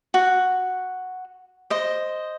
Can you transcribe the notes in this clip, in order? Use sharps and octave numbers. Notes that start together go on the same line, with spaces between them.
F#4
C5 D#5